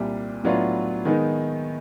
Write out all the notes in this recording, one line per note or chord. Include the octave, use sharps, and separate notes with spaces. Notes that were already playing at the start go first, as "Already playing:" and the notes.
Already playing: C2 A#2 G3
A2 F#3 B3 D4 F4
D#3 G#3 B3 D#4